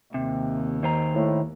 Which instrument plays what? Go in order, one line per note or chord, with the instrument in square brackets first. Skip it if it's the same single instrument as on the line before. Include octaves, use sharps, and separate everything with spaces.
[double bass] D#2 [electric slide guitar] C3
[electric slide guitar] D#3 C5 A#5
[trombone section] A2